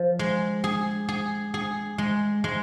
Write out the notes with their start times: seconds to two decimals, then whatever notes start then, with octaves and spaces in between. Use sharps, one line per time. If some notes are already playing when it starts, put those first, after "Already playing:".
Already playing: F3
0.19 G#3
0.64 G#4
1.09 G#4
1.54 G#4
1.98 G#3
2.44 G#3